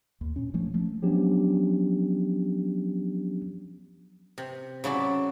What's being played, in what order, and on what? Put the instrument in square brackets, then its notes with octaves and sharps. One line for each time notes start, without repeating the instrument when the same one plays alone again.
[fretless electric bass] D#2
A#2 C#4
F3 A3 C#4
F3 A3
[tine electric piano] F3 F#3 B3 C#4 D4 G4
[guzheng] C3
C#3 F#3 E4 D5